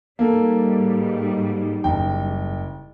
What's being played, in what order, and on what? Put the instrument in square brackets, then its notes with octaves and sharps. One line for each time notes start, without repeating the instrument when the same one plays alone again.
[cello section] G#2 G3 [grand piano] A#3 A4
[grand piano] F#1 G5